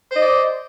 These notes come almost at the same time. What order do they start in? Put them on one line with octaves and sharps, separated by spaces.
C5 D#5 D5